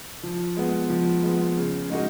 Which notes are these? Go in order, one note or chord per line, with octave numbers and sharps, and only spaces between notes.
F3
G#3 B3
F3
G#3 B3
C#3
G#3 D#4 F#4 A#4